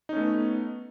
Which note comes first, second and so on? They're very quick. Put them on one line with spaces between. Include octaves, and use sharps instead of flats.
D#4 C#4 A3 B3